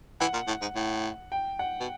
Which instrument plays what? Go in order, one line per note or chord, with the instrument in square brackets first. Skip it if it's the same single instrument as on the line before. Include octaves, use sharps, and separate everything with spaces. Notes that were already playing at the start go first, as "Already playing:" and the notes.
[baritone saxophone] E3 [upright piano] F#5
[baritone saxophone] A#2
A2
G#2
A2
[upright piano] G5
F#5
[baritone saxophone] B2